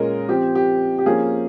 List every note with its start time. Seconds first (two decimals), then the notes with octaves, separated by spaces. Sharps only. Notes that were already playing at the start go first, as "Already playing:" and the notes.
Already playing: A#2 G#3 C#4 A#4 D#5
0.28 F3 C4 G4
0.55 G4
0.99 G4
1.06 F3 A#3 C#4 G#4